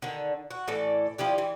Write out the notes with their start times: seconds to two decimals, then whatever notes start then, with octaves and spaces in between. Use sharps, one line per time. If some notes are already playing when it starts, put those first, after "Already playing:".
0.02 D3 D#3
0.51 F#4
0.68 A2 E3 A4 D5
1.18 F3 E4 G4 D5
1.38 E3